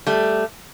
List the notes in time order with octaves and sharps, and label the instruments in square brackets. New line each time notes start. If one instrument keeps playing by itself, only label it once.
[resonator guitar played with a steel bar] G3 A3